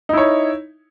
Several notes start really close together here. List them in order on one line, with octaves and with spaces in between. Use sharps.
D#4 E4 C#5